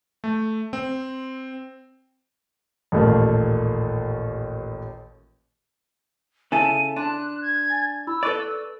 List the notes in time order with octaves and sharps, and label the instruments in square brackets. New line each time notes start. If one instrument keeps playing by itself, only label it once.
[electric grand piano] A3
C4
[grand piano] A1 D#2 A#2 A3 A#3
[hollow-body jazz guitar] C#3 E4 A4 [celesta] G#5 E7 [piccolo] D#7
[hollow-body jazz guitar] D4 [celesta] A5 C6 [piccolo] F#6
[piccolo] G#6
[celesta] G#5 A6
[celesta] E4 B5 [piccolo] E6
[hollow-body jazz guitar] A4 B4 D5 [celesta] C#6 A6